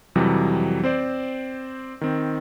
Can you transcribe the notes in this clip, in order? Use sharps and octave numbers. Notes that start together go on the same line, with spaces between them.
F2 C3 E3 F#3 G3
C4 C5 D5
D#3 C4